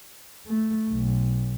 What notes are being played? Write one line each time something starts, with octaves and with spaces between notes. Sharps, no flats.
A3
B1